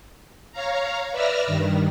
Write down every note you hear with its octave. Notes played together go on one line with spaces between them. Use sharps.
C#5 F5 A#5
B4 D5 E5 E6 F6 A#6
G2 D#3